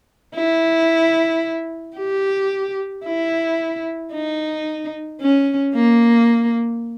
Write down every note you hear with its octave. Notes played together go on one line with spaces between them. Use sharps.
E4
G4
E4
D#4
C#4
A#3